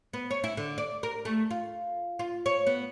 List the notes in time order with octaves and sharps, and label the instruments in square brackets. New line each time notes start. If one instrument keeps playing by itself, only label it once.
[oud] B3
C#5
E4
D3
D5
A#4
A3
F4
F4
C#5
B3